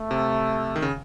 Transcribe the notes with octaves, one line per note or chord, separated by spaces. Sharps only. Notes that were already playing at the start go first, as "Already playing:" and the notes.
Already playing: A3
C3
D#3
C#3